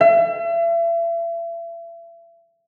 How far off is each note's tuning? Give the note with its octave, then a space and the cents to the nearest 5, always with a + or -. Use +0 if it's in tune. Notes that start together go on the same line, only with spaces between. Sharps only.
E5 +40